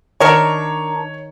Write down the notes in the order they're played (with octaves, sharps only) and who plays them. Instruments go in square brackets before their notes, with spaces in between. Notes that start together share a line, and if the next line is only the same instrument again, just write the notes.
[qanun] D#3 [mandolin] D4 A#4 C#6 [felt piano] C#5